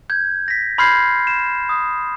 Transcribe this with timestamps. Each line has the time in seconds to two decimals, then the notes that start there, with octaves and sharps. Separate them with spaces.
0.10 G6 G#6
0.48 A#6 B6
0.78 B5 C6 F6 G6 G#6 C7
1.27 E7
1.69 D#6